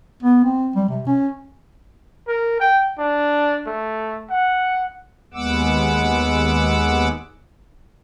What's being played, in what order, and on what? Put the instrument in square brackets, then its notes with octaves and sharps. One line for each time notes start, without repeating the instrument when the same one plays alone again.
[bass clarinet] B3
C4
G3
C3
C#4
[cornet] A#4
G5
D4
A3
F#5
[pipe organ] D#2 G#3 B3 F#5 D6 E6